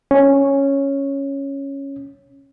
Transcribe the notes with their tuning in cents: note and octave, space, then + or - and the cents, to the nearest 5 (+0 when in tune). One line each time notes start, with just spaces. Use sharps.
C#4 -5